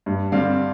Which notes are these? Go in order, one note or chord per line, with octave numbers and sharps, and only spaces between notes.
G2
D3 G3 C4 F5